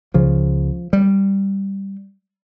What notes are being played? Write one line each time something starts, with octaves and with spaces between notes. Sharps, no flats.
C#2 C#3 F3
G3